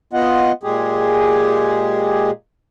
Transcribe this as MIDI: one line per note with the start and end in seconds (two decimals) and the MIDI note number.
0.13 0.52 59
0.13 0.52 65
0.13 0.52 75
0.13 0.52 78
0.63 2.31 46
0.63 2.31 56
0.63 2.31 67
0.63 2.31 68